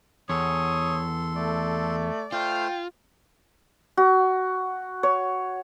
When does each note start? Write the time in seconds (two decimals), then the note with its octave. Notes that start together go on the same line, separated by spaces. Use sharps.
0.29 E2 A4 C#5 C6 D#6
1.36 A3 D5
2.32 A3 F4 C5 F5 G5
3.97 F#4
5.03 C#5